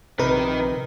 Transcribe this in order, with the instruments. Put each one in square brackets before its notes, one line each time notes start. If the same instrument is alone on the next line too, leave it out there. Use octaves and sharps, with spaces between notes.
[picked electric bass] A#1 C3 [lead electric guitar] D#4 A#4 [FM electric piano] B4